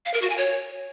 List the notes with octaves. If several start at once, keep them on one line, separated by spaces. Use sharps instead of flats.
F5
A#4
F#4
G#5
C#5